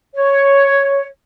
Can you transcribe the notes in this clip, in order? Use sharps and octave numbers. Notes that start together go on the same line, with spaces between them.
C#5